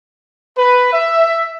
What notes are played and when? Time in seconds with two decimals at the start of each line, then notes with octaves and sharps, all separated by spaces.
0.58 B4
0.93 E5